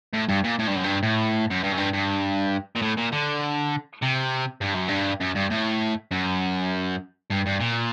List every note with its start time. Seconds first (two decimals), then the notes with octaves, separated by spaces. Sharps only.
0.14 A2
0.29 G2
0.44 A#2
0.59 A2
0.67 G2
0.76 F#2
0.84 G2
1.03 A2
1.50 F#2
1.63 G2
1.72 F#2
1.78 G2
1.93 G2
2.76 A#2
2.82 A2
2.97 A#2
3.12 D3
4.02 C3
4.61 G2
4.74 F#2
4.88 G2
5.21 F#2
5.36 G2
5.51 A2
6.11 F#2
7.30 G2
7.46 G2
7.60 A#2